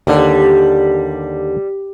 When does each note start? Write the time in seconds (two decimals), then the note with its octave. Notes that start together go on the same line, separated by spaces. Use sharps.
0.07 D#2 D3 G3